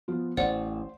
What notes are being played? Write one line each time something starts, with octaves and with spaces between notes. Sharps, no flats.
F3 B3 F4
A1 C5 D5 F#5